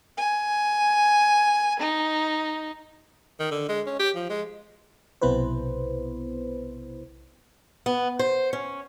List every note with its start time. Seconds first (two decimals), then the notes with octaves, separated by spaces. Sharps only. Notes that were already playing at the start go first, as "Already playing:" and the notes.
0.17 G#5
1.79 D#4
3.40 D#3
3.51 D3
3.69 G#3
3.87 C#4
3.99 G4
4.15 F3
4.30 G#3
5.21 B1 C3 B3 E4 B4 C5
7.86 B3
8.19 C5
8.53 C#4